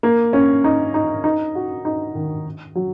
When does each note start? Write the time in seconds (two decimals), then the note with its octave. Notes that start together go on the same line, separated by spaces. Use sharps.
0.03 A#3
0.33 C#4
0.64 D#4
0.94 D#4
1.24 D#4
1.55 F#4
1.85 D#4
2.15 D#3
2.75 F#3